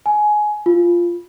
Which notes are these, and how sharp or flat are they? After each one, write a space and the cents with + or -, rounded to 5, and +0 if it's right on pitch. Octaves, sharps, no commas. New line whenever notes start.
G#5 +15
F4 -10